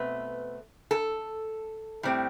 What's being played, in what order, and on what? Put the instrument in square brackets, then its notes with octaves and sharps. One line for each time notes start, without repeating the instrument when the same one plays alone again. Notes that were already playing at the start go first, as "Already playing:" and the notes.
Already playing: [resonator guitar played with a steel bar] B2 A3 C4 B4
A4
A2 G3 C4